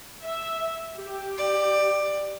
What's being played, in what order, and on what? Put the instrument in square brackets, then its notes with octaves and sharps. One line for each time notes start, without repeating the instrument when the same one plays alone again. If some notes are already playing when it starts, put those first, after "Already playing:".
[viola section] E5
G4
[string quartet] D5